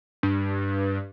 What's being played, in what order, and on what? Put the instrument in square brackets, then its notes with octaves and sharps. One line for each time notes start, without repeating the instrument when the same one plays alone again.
[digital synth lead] G2